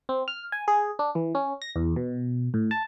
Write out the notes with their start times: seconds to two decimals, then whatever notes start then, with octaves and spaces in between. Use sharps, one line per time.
0.09 C4
0.28 F6
0.52 G#5
0.68 G#4
0.99 D4
1.15 E3
1.35 C#4
1.62 A#6
1.76 E2
1.96 B2
2.54 A2
2.71 A5